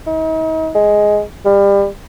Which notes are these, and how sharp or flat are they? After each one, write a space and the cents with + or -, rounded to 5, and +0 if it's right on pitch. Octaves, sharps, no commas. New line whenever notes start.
D#4 +40
G#3 +5
G3 +30